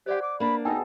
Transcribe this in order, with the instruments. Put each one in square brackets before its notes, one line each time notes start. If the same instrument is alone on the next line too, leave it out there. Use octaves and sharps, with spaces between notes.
[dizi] G4 [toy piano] C5 D5 F#5
[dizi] D6
[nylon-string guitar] A#3 D4 [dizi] B5
[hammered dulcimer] B2 G#4 A4 [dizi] D#4 [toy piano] G5